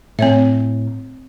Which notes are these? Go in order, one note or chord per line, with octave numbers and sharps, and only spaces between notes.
A2 C4 C#5 E5